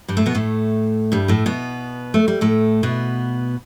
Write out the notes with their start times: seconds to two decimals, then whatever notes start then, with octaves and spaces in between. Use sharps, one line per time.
0.08 G2 G3
0.17 A2 A3
0.26 B2 B3
0.35 A2 A3
1.12 G2 G3
1.28 A2 A3
1.46 B2 B3
2.14 A3
2.28 G3
2.41 A2 A3
2.83 B2 B3